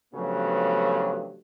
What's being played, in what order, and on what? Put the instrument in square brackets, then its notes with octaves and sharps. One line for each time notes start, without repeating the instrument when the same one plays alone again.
[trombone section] G2 C#3 F3 F#3 A3 B3